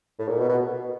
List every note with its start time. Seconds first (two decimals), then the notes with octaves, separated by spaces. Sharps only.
0.19 A2
0.28 A#2
0.39 B2
0.49 B2